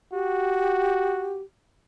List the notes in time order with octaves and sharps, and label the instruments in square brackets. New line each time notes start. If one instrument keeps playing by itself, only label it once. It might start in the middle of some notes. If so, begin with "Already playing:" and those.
[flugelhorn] F#4 [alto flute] G4